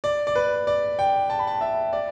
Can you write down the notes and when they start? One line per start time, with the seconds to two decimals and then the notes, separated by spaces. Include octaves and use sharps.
0.04 D5
0.27 D5
0.35 B4
0.67 D5
0.99 G5
1.30 A5
1.39 B5
1.47 A5
1.61 E5
1.93 D5